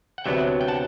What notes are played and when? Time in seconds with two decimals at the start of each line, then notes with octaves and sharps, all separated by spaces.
0.18 F#5
0.24 D2 C3 F#3 B3 D4 E5 G5
0.61 G5
0.68 F#5 A5